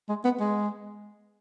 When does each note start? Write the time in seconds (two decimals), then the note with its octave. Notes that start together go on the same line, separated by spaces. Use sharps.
0.09 G#3
0.25 B3
0.40 G#3